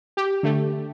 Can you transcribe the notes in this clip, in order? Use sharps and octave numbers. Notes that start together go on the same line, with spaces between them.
G4
D3 A3